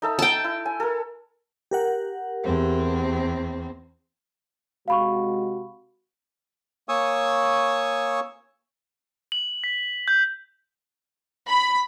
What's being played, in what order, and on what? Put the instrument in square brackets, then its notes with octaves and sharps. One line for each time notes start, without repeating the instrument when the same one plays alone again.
[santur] D#4 A4 E5
[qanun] G5 A5
[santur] E4
G#5
A4 A#4
[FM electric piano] G4 A#4 F#5
[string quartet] E2 C4
[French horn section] C3 G#3 F#4 [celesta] F5 B5 C#6
[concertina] A#3 C#5 G#5 C#6 D#6 E6
[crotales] F#7
B6
G6
[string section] B5